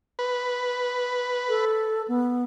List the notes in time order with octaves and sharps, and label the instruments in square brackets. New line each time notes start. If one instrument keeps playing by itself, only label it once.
[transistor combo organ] B4
[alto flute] A4
B3